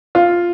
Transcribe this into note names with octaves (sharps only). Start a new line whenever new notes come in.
F4